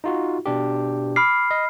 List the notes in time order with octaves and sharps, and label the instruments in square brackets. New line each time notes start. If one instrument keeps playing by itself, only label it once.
[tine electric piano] D#4 F4 F#4
B2 D4 G4
[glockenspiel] B5 F6 C7 [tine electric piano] D6
[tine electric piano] D#5